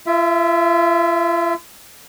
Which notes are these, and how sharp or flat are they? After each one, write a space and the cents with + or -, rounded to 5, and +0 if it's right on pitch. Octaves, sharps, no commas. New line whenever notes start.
F4 -40 E5 +0